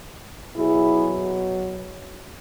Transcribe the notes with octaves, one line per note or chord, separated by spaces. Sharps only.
B2 F#3 E4 G#4